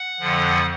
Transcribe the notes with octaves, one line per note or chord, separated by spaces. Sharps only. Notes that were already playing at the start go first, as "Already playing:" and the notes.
Already playing: F#5
F2 D3 F3